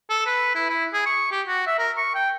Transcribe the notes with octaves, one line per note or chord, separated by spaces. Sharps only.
A4
B4
E4
E4
G#4
C#6
G4
F#4
E5
A#4
C#6
G5